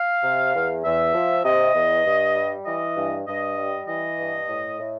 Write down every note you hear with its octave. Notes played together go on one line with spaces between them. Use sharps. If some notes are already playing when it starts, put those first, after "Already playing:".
Already playing: F5
C3
E2
E2 E5
F3
C3 D#5
E2
G2
G3
E3 D#5
G2
G2 D#5
G3
E3 D#5
G2
A2
A2